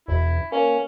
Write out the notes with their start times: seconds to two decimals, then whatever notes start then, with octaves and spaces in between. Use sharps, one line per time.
0.08 E1 E4
0.52 A#3 C#4